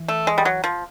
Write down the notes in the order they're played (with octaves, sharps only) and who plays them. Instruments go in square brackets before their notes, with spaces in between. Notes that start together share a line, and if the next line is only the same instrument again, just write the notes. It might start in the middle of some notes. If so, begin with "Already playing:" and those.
Already playing: [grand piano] E3
[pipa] A3
G#3
G3
F#3
F3